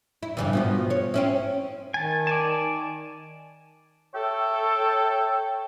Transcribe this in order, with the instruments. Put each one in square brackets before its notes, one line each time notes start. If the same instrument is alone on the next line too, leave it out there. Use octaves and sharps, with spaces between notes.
[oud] E4
G2 C#3 E3
B2 F3 B3
C#5
C4 C#4 E4
[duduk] D#3 [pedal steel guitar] G#5 A5
[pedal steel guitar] D5 G#5 A5
[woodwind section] A4 C#5 E5 G5